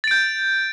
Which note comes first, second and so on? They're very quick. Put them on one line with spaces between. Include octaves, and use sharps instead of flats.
A6 D7 G6